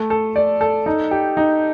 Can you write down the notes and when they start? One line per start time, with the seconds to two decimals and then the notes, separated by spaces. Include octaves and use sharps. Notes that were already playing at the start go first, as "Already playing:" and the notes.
Already playing: A3
0.10 A4
0.36 D5
0.61 A4
0.86 D#4
1.11 G4
1.37 D#4